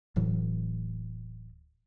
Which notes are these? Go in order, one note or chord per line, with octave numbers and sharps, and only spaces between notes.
D1 A2 E3 F#3